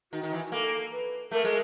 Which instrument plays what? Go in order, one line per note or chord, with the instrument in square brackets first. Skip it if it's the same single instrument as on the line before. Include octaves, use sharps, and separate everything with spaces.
[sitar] D#3 [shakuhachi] F#4
[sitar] D#3
E3
[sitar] A#3 [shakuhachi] A4
[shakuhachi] B4
[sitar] A3 [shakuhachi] A#4
[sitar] G#3